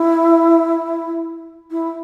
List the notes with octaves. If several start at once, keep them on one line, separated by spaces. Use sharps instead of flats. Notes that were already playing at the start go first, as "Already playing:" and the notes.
Already playing: E4
E4